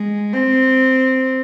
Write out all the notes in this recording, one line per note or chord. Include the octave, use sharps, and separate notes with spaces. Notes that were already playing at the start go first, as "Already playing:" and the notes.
Already playing: G#3
C4